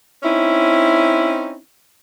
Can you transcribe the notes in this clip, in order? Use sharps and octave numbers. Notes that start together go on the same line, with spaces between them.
C4 C#4 D#4 E4